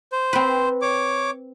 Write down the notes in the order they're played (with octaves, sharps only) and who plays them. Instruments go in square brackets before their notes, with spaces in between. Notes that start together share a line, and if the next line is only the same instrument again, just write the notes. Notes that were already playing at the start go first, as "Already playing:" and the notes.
[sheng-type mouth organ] C5
[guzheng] C4 B4
[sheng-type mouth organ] C#5 D6